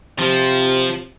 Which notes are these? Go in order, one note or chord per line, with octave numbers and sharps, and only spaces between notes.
C3 F3